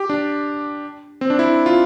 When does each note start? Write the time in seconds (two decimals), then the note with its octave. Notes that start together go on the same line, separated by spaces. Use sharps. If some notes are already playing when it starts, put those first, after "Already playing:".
Already playing: G4
0.09 D4
1.21 C4
1.30 D4
1.39 E4
1.66 F4